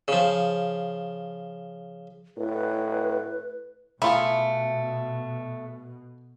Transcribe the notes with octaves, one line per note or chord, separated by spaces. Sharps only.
C#3 F3
A2 B4
B2 A3 E4 F4 G#4